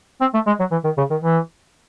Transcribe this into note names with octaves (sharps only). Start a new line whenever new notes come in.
C4
A3
G#3
F#3
E3
D#3
C#3
D#3
E3